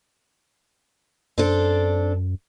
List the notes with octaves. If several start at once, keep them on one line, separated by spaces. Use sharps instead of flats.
F#2 C4 D4 A4